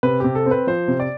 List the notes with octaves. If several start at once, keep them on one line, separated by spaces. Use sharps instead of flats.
C3 B4
C3 G4
A4
C4
B4
F3 C5
C3
D5